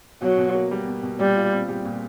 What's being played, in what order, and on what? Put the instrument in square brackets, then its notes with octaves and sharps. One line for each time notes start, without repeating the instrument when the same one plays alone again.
[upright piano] B2 [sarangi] F#3
[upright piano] B2
A#3
G3
B2
B2
[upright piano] A#2 [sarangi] G3
[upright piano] F4
C4
G3
A#2